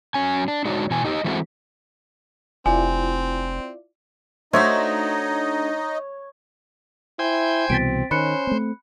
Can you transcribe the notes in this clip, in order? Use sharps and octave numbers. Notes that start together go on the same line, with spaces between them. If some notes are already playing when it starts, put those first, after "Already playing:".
F#3 C#4 G#5
D4
G#3 D4 D#4 F#4 C#5 D5
B2 E3 G#5
D#4 G4 D#5
E3 G#3 A3 C4 E4 F#4
F1 C4 E4 F4 D5 G#5
A3 D4 D#4 F#4 C5 C#5 D#5 E5
E4 C5 G5 G#5
C2 B2 E3 C4 A6 B6 D7
D#3 C#4 C5 B5 F#6 C#7
A3 C4